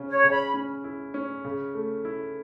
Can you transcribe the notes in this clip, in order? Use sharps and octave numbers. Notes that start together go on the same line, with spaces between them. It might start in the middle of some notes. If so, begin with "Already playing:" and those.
Already playing: C#3 C#4
C#5
C#3
B5
C#4
E4
C#4
C#3
A3
E4